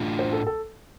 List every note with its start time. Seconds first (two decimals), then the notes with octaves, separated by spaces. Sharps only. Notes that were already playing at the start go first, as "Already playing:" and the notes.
Already playing: A2 A3 D4 F4
0.19 C5
0.33 A4
0.47 A4